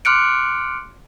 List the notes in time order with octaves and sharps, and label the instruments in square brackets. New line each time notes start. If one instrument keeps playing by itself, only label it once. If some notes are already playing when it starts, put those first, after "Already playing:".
[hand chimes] C6 D6 F6 F#6 C#7 D7